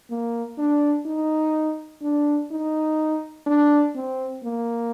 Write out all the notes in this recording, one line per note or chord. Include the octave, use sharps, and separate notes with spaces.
A#3
D4
D#4
D4
D#4
D4
C4
A#3